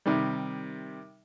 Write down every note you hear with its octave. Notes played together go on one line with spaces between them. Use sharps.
C3 D#3 G3